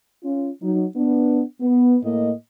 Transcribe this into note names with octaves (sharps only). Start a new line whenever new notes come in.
C#4 F4
F#3 D#4
B3 D4
B3
A2 A#3 D#5